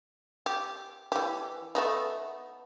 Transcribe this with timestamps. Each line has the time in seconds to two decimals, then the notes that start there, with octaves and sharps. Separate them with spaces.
0.46 G4
1.12 E3 G4
1.75 A3 B3 D#4